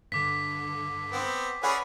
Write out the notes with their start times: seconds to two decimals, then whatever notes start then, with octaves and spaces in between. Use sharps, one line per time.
0.12 G2 D3 D6 B6
1.12 B3 C4
1.63 C#4 G#4 B4 D5 F#5